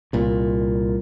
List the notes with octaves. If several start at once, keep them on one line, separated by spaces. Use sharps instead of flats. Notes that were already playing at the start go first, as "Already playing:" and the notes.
C2 A#2